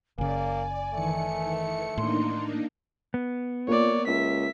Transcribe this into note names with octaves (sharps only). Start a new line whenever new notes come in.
F#1 C#3 A#3 D5 G#5
D#3 E3 A3 C#7
A2 A#3 D4 D#4 C6
B3
A#2 A#3 C#5 D5
C#2 E5 B6